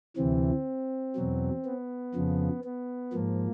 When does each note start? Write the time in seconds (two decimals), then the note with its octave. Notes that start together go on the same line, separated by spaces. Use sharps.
0.17 D2 C3 E3 C4
1.16 E2 B2 F#3
1.65 B3
2.15 F2 C#3 F3
2.64 B3
3.13 G#2 F3 A#3